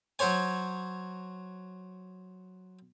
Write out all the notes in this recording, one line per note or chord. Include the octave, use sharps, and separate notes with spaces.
F#3 F#4 C5 C#5 G#5